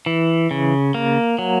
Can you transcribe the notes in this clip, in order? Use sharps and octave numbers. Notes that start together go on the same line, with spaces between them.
E3
C#3
A#3
F#3